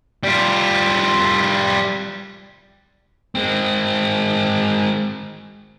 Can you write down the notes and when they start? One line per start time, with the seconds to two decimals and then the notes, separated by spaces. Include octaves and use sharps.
0.23 G3 F4
3.35 G#3 C4